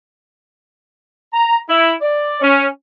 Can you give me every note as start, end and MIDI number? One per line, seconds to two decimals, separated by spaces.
1.33 1.57 82
1.69 1.93 64
2.02 2.40 74
2.41 2.65 61